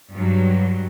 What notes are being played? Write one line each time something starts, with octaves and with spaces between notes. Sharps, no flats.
G2 F#3